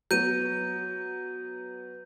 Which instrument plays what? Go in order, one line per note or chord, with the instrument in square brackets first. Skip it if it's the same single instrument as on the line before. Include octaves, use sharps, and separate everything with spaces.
[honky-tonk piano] F#3 B3 [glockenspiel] G6 D#7